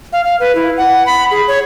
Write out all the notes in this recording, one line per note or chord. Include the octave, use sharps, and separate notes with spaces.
F5
F5
B4
E4
F#5
B5
G#4
C#5